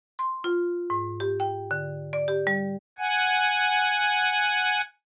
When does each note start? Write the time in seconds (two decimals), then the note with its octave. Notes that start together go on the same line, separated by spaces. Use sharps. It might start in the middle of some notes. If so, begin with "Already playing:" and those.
0.19 C6
0.44 F4
0.90 G#2
1.20 G4
1.40 G5
1.71 D3
2.13 D5
2.28 G4
2.47 G3
2.99 F#5 G#5